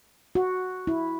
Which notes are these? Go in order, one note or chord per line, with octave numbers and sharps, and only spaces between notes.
F#4
E4